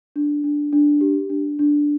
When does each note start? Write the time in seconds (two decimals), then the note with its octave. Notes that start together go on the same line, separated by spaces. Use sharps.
0.16 D4
0.44 D4
0.73 D4
1.01 G4
1.30 D4
1.59 D4